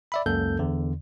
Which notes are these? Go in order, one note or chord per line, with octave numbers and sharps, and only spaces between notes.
D5 E5 B5
C#2 F#2 A#3 A4 G6
E2 D3